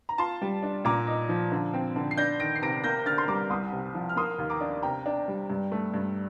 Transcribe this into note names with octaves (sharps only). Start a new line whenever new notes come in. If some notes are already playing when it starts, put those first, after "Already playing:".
A#5
F4 A5 C6
G3
D4
A#2 A#5 D6
D#4
F3
D3
C4
D3
C7
D4 G6 A#6
D#3 A#6 D7
C7
C3 A#6 D7
A#3 G6 A#6
D3 F6 A6
C6
G3 A#5 D6
C2 C6 D#6
C3
F3
F6
A#3 C6 D#6
D#2
A#5 D6
D4
C3 G5 A#5
D4
G3
G2
A3
G2